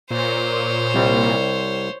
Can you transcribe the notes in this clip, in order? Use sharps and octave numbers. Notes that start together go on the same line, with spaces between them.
A#2 C5 C#5
C2 G3 C4